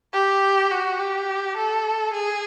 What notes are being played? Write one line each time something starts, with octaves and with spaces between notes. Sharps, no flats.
G4
F#4
G4
A4
G#4